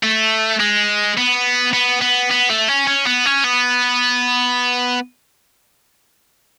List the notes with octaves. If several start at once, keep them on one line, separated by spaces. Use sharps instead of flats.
A3
G#3
B3
B3
B3
B3
A3
C#4
C#4
B3
C#4
B3